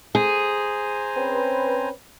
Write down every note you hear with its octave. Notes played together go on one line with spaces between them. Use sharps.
G#4 C5 G#5 A#5
C4 C#4 B4